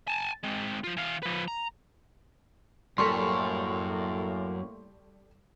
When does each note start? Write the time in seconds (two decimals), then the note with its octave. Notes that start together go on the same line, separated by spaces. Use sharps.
0.08 G#5 A5
0.43 G#3 C4
0.84 F3 F4
0.97 E3 F5
1.23 F3 B4
1.48 A#5
2.98 F#2 A2 G3 A#3 A4 C6 C#6